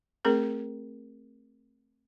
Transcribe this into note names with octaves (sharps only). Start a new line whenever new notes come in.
A3 C4 G#4 A#4